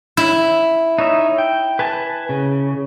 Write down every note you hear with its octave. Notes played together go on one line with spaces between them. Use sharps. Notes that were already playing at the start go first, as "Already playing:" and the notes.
E4
D#4 C#5 E5
G5
B4 G#5 A5
C#3